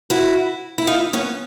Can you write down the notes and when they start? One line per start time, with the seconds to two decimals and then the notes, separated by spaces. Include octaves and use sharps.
0.10 E4 F#4
0.78 E4
0.87 D#4 F4
1.13 B3 C#4